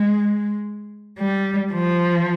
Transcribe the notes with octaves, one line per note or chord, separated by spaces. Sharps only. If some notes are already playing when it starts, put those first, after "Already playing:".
Already playing: G#3
G3
F3